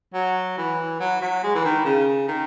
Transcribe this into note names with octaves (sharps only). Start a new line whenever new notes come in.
F#3
E3
F#3
F#3
G#3
E3
D#3
C#3
D#3